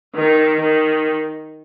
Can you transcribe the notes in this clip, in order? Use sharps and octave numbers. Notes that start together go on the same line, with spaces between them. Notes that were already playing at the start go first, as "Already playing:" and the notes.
D#3
D#3